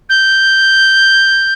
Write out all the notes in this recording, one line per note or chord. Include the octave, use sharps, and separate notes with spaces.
G6